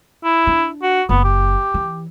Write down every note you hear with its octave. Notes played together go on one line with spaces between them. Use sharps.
E4
D4
F#4
F#1 B3
G4
E3